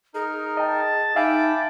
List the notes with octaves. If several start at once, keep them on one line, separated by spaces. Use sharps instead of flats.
D#4 G#4 A#4
D#5 G5 A5
D#4 E5 F5 G5 G#5 B5 D6